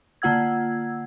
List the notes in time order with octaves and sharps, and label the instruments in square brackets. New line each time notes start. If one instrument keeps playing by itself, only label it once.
[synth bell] D3 A#3 F4 F#5 E6 G#6